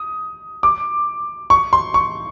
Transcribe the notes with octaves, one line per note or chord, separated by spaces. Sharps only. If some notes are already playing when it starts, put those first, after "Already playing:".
Already playing: D#6
D6
C#6
C6
C#6